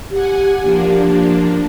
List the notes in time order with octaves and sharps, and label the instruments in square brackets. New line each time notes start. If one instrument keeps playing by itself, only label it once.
[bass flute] G4 [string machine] F#5 G#5
[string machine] F3 A#3 D4